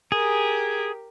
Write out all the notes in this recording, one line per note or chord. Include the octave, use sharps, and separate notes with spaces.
G4 G#4 A#4